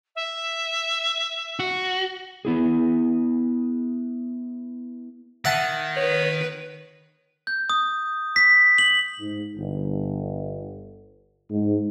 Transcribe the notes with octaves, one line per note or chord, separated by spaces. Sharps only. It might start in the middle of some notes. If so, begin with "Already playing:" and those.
E5
F#4
B3 E4 G#4
D#3 E5 F#5 A5
B4 C#5
G6
D#6
B6
F#7
G#2
G1
G#2